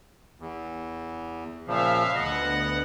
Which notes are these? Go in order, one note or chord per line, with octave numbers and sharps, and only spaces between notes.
E2
A#2 C#3 F3 E5 F5
D2 B3 D#5 F#5